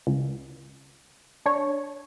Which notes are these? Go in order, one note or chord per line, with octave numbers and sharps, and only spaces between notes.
C#2
D4 C#5